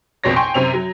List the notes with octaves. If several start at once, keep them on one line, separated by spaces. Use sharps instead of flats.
A#1 F2 B2 C#5 A#6
G5 G#5 C6 C#6
F#2 C3 C4 F7
F#3